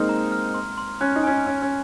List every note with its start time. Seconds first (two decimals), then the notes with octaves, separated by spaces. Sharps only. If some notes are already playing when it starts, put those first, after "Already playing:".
Already playing: G#3 A#3 C4 D#4 F6
0.09 A#5
0.32 F6
0.54 C6
0.78 C6
1.01 C#4 F#6
1.16 D#4
1.23 C#4 G#5
1.31 D#4
1.47 C#4 G#5
1.62 C#4